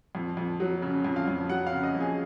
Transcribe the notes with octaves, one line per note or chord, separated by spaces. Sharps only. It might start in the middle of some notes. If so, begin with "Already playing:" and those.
F2
F2
F#3
C#3
F2
F5
F2
F#3 F#5
F5
C#3
D#5
F2
G#4